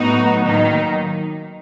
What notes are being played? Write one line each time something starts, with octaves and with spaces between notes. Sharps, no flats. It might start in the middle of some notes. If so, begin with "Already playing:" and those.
Already playing: A2 F#3 B3 D#4 F#4
D#3 F#3 A#3 D#4